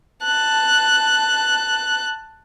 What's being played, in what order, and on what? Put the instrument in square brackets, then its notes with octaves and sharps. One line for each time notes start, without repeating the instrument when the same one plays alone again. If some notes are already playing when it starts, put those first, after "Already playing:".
[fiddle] A5 F#6